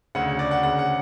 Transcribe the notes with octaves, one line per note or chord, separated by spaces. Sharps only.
D2 C#3 F#5
D5
F#5
D2 C#3 F#5
F#5